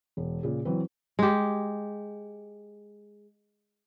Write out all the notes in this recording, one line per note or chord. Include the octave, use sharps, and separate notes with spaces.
E1
A#2 C#3 G#4
E3 F#3 C4 B4
G#3 G4